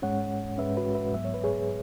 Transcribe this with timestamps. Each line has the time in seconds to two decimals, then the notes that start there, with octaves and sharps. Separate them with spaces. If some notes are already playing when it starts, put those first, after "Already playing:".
0.02 G#2 G#3 C#4 C#5 F#5
0.58 G#2 G#3 C#4 B4 E5
0.77 F#4 B4
0.95 B4 E5
1.14 G#2 F#3 B3 E5
1.25 C#5
1.34 B4
1.44 G#4 C#5